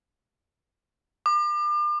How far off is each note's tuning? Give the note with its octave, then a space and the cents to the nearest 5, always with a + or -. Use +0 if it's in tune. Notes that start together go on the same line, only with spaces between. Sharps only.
D6 +40